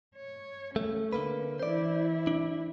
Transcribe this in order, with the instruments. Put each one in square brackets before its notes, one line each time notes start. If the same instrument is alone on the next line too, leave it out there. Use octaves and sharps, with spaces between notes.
[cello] C#5
[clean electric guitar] A3 [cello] C#4
[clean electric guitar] D3 A#3 B4
[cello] E3 E4 [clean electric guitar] C5 D5
[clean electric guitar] D4